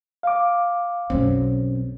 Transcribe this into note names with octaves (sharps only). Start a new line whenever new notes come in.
F5 D6
B1 F#2 C4 C#4